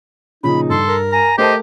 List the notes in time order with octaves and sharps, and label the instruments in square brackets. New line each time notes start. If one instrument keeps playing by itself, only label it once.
[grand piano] A#2 C#3 F3 [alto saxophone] D#4 [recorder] B5
[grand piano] G2 [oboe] A4 [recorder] C6
[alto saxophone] A#4
[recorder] G#5 [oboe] A#5
[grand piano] A3 A#4 A5 [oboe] G4 [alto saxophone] C5 [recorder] D#5